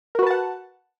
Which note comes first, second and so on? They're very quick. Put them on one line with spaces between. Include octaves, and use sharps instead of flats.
A#4 F#4 B4 A5 F#5